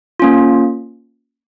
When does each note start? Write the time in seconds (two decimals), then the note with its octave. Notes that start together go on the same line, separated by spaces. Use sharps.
0.20 A#3 C#4 F4